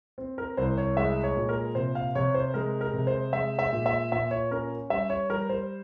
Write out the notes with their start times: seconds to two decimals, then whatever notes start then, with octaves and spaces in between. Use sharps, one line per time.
0.18 C4
0.38 A#4
0.57 C2 C5
0.77 C#5
0.97 G#3 E5
1.23 C#5
1.37 A#2
1.49 A#4
1.75 C3 C5
1.95 F5
2.15 C3 C#5
2.34 C5
2.54 G#3 A#4
2.81 A#4
2.94 C3
3.07 C5
3.33 G#3 E5
3.59 E5
3.72 A#2
3.86 E5
4.12 A#2 E5
4.31 C#5
4.51 C#4 A#4
4.90 G3 E5
5.10 C#5
5.30 G3 A#4
5.49 C5